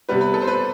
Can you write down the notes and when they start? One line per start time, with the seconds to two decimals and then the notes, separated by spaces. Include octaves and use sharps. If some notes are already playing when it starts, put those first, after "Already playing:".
0.09 C3 G3 B3 B4
0.21 B4
0.34 A4
0.42 C5
0.48 B4